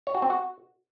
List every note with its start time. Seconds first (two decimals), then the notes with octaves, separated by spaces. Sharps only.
0.07 C#5
0.15 F#4
0.22 C4
0.30 F#4